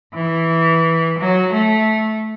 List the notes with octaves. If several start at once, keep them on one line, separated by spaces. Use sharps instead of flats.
E3
F#3
A3